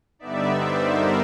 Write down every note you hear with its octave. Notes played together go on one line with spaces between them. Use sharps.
G2 D3 G3 B3 D#4 D5 E5
C5 D5
A#4 C5